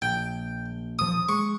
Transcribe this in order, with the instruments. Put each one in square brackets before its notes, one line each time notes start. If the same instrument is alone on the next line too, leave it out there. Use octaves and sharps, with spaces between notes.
[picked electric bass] A#1 [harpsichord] G5
[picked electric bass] D#1 F3 [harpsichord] D#6
[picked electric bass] G#3 [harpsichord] C#6